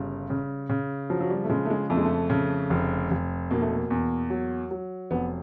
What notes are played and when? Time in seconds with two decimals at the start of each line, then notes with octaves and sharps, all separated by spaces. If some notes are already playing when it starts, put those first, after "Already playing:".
Already playing: G1 C#3 G3
0.30 C#3
0.69 C#3
1.10 F3 F#3
1.20 F#3
1.30 G3
1.44 A3
1.49 C#3 G#3
1.65 A3
1.70 G#3
1.90 F2 A3
1.97 G#3
2.04 A3
2.30 C#3
2.70 F1
3.11 F1
3.51 B2 A#3
3.61 A3
3.72 A#3
3.90 E2
4.30 F#3
4.71 F#3
5.11 F1 B3